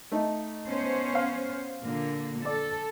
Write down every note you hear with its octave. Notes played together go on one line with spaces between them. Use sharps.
A3 D#4
B3 C#4 C5
F5
A#2 D3 A#3
A4 D5